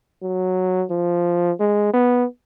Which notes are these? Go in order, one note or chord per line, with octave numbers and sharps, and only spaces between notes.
F#3
F3
G#3
B3